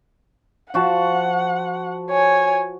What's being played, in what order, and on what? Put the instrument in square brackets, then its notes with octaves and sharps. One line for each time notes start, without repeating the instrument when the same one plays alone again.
[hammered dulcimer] F3 F#4 A5 [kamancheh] F#5
[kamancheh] C#5 G#5